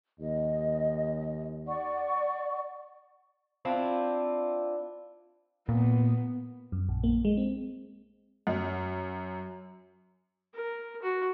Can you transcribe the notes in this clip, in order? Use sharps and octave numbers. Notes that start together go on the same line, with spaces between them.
D#2 D#5
D5 F#5 C#6
C4 D4 E4 F4
A#2 B3
F#2
A#1
A#3
G#3
C4
F#2
A#4
F#4